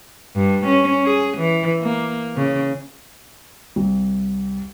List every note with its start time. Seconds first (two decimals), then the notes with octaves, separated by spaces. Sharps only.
0.36 G2
0.67 C#4
1.05 G#4
1.37 E3
1.82 A#3
2.37 C#3
3.76 C2